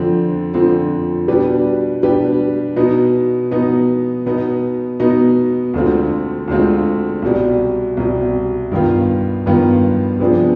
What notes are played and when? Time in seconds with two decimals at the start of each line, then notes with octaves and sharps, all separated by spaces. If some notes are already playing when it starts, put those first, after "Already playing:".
Already playing: F2 D3 F3 C4
0.54 F2 D3 F3 C4
1.28 B2 G3 D4 G4 B4
2.03 B2 G3 D4 G4 B4
2.76 B2 B3 D#4
3.51 B2 B3 D#4
4.26 B2 B3 D#4
5.00 B2 B3 D#4
5.74 D2 D3 G#3 C4 F4
6.48 D2 D3 G#3 C4 F4
7.22 C2 B2 G3
7.97 C2 B2 G3
8.72 G2 D#3 B3 F4
9.46 G2 D#3 B3 F4
10.20 C3 F3 B3 D4 G#4